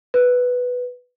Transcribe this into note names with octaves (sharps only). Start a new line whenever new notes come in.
B4